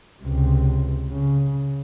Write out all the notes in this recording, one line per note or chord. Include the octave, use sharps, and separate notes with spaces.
C#2 C3
C#3